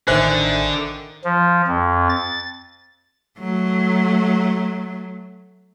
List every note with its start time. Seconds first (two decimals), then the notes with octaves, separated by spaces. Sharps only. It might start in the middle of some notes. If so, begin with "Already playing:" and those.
0.08 A1 D3 D#3 C5 E5 G#5 F#6
1.25 F3
1.68 F2
2.09 A6
3.38 F#3 A3